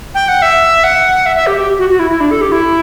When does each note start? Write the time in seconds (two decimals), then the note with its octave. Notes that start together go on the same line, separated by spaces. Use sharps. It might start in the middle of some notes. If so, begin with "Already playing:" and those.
0.15 G5
0.28 F#5
0.42 E5
0.84 F#5
1.26 E5
1.36 E5
1.47 G4
1.57 G4
1.79 F#4
1.89 F#4
1.99 E4
2.10 E4
2.20 D4
2.31 A4
2.41 G4
2.52 E4